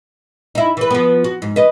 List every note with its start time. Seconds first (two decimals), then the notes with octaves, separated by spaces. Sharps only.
0.55 D#4 E4
0.77 E3 B4
0.90 F3 B3
1.24 F#4
1.42 G#2
1.56 B4 D#5